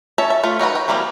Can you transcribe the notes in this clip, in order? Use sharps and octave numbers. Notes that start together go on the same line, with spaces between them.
C#4 C#5 E5 A5
E5
A3 F4
F#3 D#4 F#4 B4
G5
E3 F#3 G3 A#3 C4